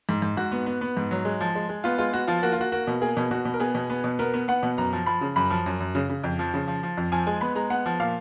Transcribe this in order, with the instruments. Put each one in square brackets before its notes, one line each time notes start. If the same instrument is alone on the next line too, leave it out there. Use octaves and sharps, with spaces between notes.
[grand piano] G#2
G#2
G#2 F#4
B3
B3
B3
G#2
F#3
G#3
F3
G#3
G#3
B3 F4
G#3 F4
B3 F#4
F3 F4
A#3 F#4
F4
A#3 F#4
A#3 F#4
B2
A#3 G#4
B2
B2 F#4
B2
A#4
B3 G#4
B2
B3
B2
B3 A#4
B3
B3 F#5
B2
F#2 A#5
F3
F3 B5
C#3
F#2 B5
F3
F#2
F#2
C#3
C#3
F2
F3
C#3
F3
F3
F2
F3 G#5
G#3 G#5
B3 B5
G#3 A#5
B3 F#5
F3
A#2 F5